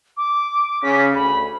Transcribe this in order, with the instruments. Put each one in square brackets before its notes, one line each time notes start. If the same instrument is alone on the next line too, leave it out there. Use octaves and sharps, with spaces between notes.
[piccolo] D6
[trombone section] C#3 [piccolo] B6
[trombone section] D2 [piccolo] B5